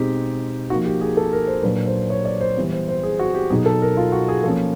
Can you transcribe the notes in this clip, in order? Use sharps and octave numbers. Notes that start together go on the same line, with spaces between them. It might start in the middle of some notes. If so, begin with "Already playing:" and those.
Already playing: B2 G#3 C4 D#4 G4
F3 A#3 D#4 F#4
G4
G#4
A4
A#4
C5
A#2 F#3 A#3 D4 B4
C5
C#5
D5
C5
E3 G3 B3
C5
C5
G#4
F#4
G4
B2 F#3 B3 D#4 G#4
A4
A#4
F4
F#4
G#4
F3 A#3 C#4 A4